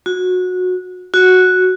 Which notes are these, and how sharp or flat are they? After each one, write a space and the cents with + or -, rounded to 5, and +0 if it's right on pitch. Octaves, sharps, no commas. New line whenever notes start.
F#4 -20
F#4 -5